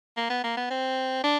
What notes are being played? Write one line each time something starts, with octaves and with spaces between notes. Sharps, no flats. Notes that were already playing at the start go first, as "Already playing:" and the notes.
A#3
B3
A#3
B3
C4
D4